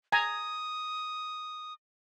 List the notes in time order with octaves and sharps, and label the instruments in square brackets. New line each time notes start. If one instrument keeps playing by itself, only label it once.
[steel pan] G#5 A#5 [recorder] D#6